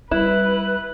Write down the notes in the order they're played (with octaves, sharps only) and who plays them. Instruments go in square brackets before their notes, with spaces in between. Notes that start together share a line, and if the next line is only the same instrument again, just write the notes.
[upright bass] G3 [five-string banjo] E4 [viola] B4 [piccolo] F#6